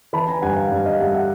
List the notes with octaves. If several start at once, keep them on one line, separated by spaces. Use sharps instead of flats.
E3 A5 B5
G#5 A#5
G2 F#5 G#5
F5 G5
G2
D#5 F5
G3 E5 F#5
E5 F#5